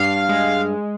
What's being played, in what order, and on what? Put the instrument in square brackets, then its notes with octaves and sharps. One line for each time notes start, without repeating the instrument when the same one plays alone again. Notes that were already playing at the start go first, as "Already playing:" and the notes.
Already playing: [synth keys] G2 [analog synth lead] F5
[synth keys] G#3